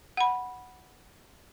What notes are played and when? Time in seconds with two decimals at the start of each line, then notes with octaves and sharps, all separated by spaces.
0.17 F#5 B5